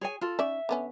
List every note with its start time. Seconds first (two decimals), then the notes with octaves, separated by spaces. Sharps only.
0.01 G#4 C#5 G#5
0.21 F4 A4
0.39 C#4 D#4 D5 E5
0.69 D3 B3 C#4